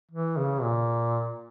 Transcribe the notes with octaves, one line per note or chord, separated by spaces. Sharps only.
E3
C#3
A#2